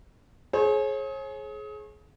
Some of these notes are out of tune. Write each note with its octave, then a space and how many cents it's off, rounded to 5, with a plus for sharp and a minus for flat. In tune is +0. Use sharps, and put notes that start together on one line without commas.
G#4 +30 C#5 -40